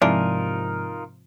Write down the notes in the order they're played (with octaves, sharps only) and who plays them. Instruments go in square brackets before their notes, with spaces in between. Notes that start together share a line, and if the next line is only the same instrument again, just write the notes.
[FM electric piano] G#2 C3 F3 [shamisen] E3 D4 [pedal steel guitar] D#4 F4 A#4